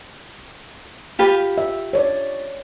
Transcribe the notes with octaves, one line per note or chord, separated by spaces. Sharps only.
F4 G4 B4
E5
C#5 D5